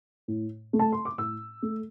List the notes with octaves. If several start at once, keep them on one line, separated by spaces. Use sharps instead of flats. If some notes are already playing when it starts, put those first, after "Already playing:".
A2
A3
A5
C6
D6
A2 E6
A3